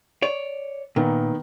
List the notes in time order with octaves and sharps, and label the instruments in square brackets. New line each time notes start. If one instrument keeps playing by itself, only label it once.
[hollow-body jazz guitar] C#5 D5
[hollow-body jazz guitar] A#2 [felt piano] D#3 B3